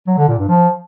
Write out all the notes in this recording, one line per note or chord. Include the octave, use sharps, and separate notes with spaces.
F#3
D3
A#2
G2
F3